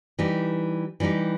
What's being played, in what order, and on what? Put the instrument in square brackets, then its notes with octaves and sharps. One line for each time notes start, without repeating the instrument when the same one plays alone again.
[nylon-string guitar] E3 G3 D#4 G4
E3 G3 D#4 G4